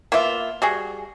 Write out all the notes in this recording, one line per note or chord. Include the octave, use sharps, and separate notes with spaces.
A#3 B3 F4 E5
G3 F#4 G#4